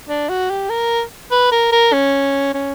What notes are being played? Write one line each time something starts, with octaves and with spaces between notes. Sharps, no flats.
D4
F#4
G4
A#4
B4
A#4
A#4
C#4
C#4